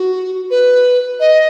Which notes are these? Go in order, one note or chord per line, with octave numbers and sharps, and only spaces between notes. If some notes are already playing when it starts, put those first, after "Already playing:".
Already playing: F#4
B4
D#5